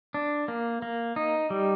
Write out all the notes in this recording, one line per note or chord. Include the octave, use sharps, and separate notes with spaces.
D4
A#3
A#3
D#4
G3